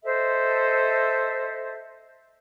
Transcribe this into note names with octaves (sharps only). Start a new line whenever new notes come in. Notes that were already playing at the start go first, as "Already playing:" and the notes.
A4 C5 D#5 E5